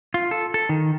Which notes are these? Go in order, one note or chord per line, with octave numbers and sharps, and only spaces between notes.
F4
A4
A4
D#3